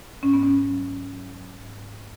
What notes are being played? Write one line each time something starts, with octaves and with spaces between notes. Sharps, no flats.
G#2 C#4
B3
C#4
F#3
F#3
G#2